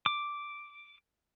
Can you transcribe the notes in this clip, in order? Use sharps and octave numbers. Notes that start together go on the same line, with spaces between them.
D6